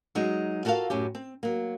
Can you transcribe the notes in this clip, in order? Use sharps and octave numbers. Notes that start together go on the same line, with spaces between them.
F#3 G#3 D#4 G#4
F4 F#4 A4 A#4 F5
F#2 A2 C#4 G4
C4
F#3 A#3